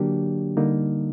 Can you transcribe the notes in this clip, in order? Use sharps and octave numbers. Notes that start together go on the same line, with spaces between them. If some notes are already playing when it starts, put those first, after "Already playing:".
Already playing: D3 F#3 A#3 D4 G4
D3 G3 A#3 D#4